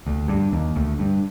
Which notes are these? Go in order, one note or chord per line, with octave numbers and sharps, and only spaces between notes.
D2
G2
D#2
D2
G2